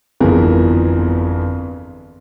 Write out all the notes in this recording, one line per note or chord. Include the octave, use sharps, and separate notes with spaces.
G1 F2 E3 B3 G#4 A#4